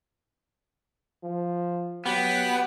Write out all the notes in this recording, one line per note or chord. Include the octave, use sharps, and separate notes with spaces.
F3
F#3 B3 G4 F#5